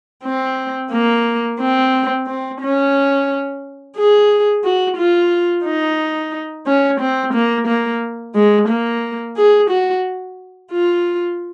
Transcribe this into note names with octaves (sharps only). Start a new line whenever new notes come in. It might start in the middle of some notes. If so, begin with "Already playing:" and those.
C4
A#3
C4
C4
C#4
G#4
F#4
F4
D#4
C#4
C4
A#3
A#3
G#3
A#3
G#4
F#4
F4